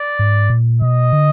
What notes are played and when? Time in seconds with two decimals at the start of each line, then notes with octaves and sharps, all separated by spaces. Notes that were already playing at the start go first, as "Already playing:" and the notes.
Already playing: D5
0.19 G#2
0.50 A#2
0.82 B2 D#5
1.13 D3